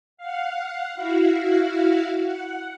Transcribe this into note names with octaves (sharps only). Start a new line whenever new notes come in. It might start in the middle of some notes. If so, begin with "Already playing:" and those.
F5 F#5
E4 F#4 F5
F#5